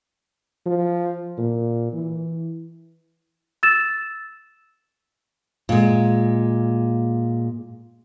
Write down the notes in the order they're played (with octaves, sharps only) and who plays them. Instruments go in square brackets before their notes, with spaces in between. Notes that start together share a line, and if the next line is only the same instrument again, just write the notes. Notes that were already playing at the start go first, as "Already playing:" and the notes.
[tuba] F3
A#2
E3
[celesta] E6 A6 E7
[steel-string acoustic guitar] A#2 G#3